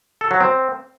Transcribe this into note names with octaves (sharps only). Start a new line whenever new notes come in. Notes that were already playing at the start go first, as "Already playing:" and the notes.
A4
F#3
C4